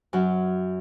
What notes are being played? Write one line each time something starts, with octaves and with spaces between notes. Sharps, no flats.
F#2 F#3